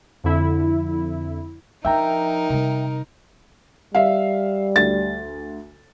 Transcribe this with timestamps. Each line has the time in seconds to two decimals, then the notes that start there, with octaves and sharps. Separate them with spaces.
0.24 F2 D3 E4
1.85 F3 D4 D#4 A#4 E5 G5 A#5
2.50 C3 G3
3.95 G3 E5 F5
4.76 D2 A6